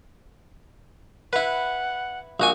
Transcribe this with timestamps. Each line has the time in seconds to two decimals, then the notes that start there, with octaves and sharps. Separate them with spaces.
1.33 E4 B4 F#5
2.40 A#1 F#4 G#5